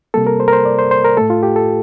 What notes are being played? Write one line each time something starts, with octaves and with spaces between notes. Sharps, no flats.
C3 G3 A#3 A4
A#4
C5
A#4
C5
D5
C5
C5
A#4
A2 A3 A4
F4
G4
A4